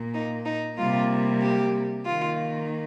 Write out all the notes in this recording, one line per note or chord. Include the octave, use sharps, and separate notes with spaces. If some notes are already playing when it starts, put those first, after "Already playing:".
Already playing: A#2 A#3
D#4
D#4
C3 G3 A#3 F4
G4
D#3 A#3 F4